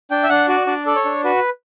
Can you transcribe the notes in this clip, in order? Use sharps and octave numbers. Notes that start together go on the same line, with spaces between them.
D4 G5
E5
D4 F#5
F#4 D5
D4 D5
A4 D5
C#5
D4
F#4 B4